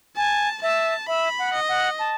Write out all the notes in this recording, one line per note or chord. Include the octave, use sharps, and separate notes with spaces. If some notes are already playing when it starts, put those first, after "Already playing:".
G#5 A5
E5 A5
E5 B5
F#5
D#5
F#5
A5